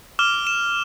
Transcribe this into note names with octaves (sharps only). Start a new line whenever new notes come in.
D6 F6 E7 G7
E7